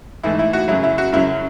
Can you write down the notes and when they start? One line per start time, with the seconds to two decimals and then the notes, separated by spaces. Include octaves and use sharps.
0.23 G#2 E3 A3 E4
0.39 E4
0.53 F#4
0.68 F#2 C#3 F#3 E4
0.83 E4
0.98 F#4
1.13 F#2 C#3 F#3 E4